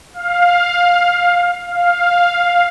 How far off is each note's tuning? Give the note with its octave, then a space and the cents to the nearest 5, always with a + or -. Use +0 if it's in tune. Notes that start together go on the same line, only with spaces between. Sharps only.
F5 +15
F5 +5